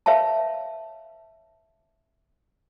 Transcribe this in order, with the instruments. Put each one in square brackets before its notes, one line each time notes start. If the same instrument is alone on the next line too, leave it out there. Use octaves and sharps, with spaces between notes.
[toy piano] B4 C#5 E5 F5 A5